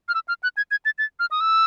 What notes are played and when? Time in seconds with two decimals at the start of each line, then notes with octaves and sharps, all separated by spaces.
0.09 F6
0.15 E6
0.28 F6
0.43 F#6
0.57 G#6
0.71 G#6
0.85 A6
0.98 A6
1.19 F6
1.31 D#6
1.40 E6